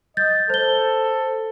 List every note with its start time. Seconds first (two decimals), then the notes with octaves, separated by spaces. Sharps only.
0.17 D#5 G6 A6
0.50 A4 C5 G7